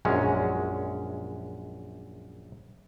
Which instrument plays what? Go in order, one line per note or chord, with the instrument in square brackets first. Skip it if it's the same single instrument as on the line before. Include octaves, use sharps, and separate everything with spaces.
[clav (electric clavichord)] A#1 F#2 G#3 C#4